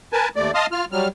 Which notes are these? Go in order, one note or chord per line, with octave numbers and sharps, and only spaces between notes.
A#4 B4 G#5 A5
D#2 A3 D5
D#5 F5 A5 C6 D#6 F6
F4 F6
F#3 G3 F6